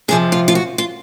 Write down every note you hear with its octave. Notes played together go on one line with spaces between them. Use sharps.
F2 C3 F3 G#4
F4
F4
F#4
F4